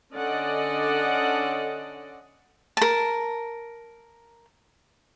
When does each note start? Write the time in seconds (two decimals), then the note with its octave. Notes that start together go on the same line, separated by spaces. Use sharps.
0.15 D3 C#4 A4 D5 D#5 F#5
2.77 A#4 A5